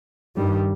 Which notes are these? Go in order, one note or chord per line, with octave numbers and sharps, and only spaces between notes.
G2 D#3 G3